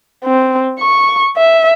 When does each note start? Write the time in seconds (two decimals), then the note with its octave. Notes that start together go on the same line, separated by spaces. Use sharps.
0.25 C4
0.80 C#6
1.37 E5